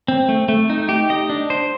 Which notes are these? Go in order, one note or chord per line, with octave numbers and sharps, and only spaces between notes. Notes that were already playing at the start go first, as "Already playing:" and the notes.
C4
A3
A3
D#4
G4
D#5
D4
C5